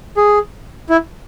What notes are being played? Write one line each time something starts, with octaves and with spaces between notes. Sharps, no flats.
G#4
E4